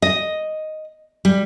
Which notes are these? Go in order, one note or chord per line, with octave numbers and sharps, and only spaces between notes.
D#5
G3